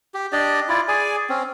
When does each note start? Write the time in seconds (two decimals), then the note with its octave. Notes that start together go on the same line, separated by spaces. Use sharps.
0.14 G4
0.32 D4 G4 D5 D#5
0.69 E4 F4 D5
0.88 G#4 D5 G#5
1.29 C4 C#4